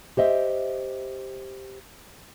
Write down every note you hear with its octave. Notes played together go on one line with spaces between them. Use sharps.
G4 C5 D#5 E5